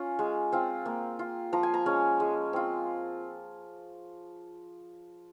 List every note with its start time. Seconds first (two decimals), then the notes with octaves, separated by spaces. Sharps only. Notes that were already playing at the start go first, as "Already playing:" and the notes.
Already playing: C#4 F4
0.19 G#3
0.52 C4 F4
0.85 A#3
1.19 F4
1.53 F3 A#5
1.63 G#5
1.74 A#5
1.86 G#3 C#4
2.20 G#3
2.53 C4 F4